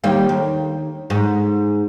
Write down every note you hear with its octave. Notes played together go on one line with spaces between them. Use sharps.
D#2 G3 A#3
D#2
G#2